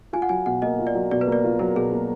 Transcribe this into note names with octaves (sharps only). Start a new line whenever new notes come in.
F4 G#5
F#5
F#3 G#5
B2 F#5
A#3 D#5
F4
D5
F#3
B2 D5
B4
A#3
D5
F4
F#3 A#4
B2 G#4
A#3